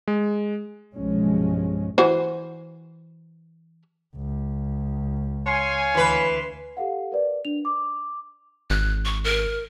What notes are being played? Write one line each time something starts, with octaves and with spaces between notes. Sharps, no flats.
G#3
B1 G2 F3 G#3 C#4
E3 F#4 C5
C#2
C#5 F5 G#5 C6
D2 E3 B4 C6
G4 A4 F5 F#5
A#4 B4 D5
D4 F7
D6
G#1 F#6
C#6
A#4